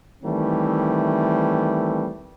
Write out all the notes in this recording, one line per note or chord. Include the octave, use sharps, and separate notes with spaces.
D#3 E3 G3 A3 C4